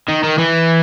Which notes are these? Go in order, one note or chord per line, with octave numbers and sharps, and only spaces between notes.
D#3
D#3
E3